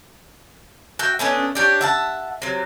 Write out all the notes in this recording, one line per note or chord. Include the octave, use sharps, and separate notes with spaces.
F#4 E5 G5
A3 B3 C#4 D4
D4 G4 C#5
E5 F#5 A5
C3 F#3